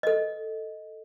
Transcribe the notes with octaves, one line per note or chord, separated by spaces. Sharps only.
A4 D#5